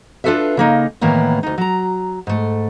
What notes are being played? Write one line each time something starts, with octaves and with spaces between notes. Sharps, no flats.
D4 F4 F#4 A4 B4 E5
C#3 A#3 D#4
A2 D#3 E3 A#3 B3
D2 D#4
F#3 A#5
G#2 A3